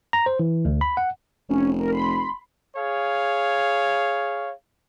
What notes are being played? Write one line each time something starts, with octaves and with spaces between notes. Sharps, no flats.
A#5
C5
E3
D2
B5
F#5
F1 C#4
A#4
B5 C6
G#4 C#5 F5